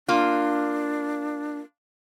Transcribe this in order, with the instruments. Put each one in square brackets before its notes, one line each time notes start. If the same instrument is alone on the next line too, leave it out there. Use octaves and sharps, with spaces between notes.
[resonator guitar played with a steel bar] A#3 F4 [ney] D4